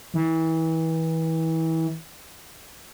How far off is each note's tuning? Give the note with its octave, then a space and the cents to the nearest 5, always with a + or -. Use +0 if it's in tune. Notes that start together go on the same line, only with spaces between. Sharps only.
E3 -30